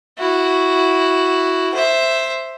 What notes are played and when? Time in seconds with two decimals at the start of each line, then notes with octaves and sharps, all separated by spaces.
0.19 E4 F#4
1.74 C5 E5